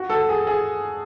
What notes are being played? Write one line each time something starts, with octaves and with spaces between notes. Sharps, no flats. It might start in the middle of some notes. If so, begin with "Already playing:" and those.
Already playing: F#4
A4
G#4
G#4